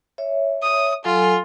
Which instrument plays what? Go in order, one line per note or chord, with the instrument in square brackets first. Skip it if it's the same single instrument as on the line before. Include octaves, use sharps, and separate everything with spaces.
[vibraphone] C#5 E5
[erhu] D#6
[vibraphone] F#3 A4 G#5 [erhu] F4